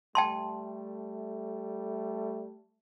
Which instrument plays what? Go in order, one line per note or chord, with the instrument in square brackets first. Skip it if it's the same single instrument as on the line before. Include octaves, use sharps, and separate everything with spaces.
[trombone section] G3 A3 [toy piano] G5 A5 C6